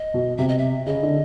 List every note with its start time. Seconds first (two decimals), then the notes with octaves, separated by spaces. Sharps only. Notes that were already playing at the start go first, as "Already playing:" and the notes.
Already playing: D#5
0.14 B2
0.38 C3 E5
0.48 D#5
0.58 E5
0.86 C#3 D#5
1.03 D3